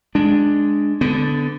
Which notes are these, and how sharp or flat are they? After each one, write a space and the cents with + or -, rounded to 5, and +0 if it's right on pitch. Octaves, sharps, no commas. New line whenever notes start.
G#3 +5 D4 +0
D3 +0 B3 +20